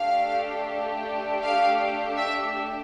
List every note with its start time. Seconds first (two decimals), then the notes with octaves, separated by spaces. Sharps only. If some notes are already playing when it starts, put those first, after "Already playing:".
Already playing: A3 D4 G4 F5
1.42 F5
2.17 E5